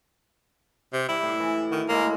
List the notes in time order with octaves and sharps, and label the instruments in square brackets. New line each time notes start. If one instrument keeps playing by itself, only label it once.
[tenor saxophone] C3
[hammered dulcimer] G3 [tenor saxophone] E4
[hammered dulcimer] A2
E3
[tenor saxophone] D#3 [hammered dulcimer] F#4
[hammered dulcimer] A2 G#3 E4 [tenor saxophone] A#3